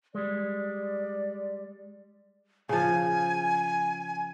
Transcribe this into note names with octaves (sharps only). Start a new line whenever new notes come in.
G3 G#3 D5
C#3 F3 G#5